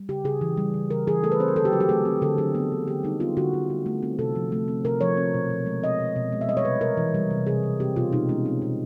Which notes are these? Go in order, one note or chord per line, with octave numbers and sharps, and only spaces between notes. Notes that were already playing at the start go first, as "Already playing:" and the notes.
Already playing: G3
C#3 G4
C#3 G#4
E3
G3
C#3
C#3 A#4
E3 G#4
A3 A4
B4
C4 C5
A#4
D3 A4
G4
F#3 F#4
G4
A3 G#4
C4
D3 A4
F#3 G#4
B3
D3
D3 G4
G3 D#4
B3 F4
D3 F#4
D3
G3
A3
C4
C3 A4
F3
A3
C4
C3 A#4
F3 C#5
C4
B2
B2
G#3
C4 D#5
B2
B2
G#3
E5
G3 D#5
C#5
C3 B4
C3 A#4
E3
G3
C3
C3 G#4
E3
C4 G4
B2 F4
B2 D#4
G#3 C#4
C4
B2